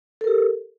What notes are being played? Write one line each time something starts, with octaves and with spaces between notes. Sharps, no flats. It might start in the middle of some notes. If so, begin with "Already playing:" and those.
G4 A4 A#4